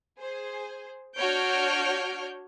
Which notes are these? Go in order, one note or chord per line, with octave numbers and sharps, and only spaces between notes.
G#4 C5
D4 F#4 C#5 F6 G6 D7